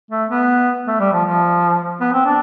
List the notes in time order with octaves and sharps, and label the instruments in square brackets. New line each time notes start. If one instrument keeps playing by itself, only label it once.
[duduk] A3
B3
A3
G3
F3
F3
B3
C4
D4